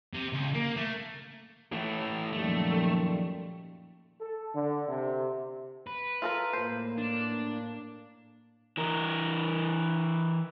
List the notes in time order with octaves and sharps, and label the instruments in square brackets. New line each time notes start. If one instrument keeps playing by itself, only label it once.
[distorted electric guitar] C3
C#2
A#3
A3
[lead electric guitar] E3 A3
[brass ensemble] F#2 D#3 G3 [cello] A#2 F3 [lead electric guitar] A3
[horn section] A4
D3
C3
[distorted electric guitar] B4
[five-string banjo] F4 A4 A#4
[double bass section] A2 A#3 [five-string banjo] C5
[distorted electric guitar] D4
[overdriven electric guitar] E3 A#4